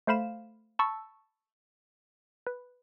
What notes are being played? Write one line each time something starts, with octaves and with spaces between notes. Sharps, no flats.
A3 C5 F5 B5 E7
A5 B5 C#6 E6
B4